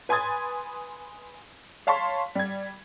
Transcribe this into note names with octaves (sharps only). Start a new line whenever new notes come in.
B4 G#5 C6 D#6 G#6 A6
C#5 F5 A5 C6 C#6 B6
G3 G#6